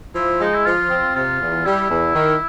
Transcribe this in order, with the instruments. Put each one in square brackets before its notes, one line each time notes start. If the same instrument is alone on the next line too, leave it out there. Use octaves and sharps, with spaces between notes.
[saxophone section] F3 [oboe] E4
[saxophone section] G#3 [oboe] D#4
[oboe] E4
[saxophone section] F3 [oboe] F4
[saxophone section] C4
[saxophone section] C3 [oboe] F4
[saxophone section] E2
[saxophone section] G3 [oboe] E4
[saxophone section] E2
D#3